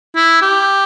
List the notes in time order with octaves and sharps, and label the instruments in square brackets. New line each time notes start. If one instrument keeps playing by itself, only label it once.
[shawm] E4
G4